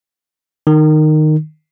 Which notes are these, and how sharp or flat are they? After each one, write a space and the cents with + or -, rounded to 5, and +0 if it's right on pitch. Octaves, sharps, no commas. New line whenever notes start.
D#3 -15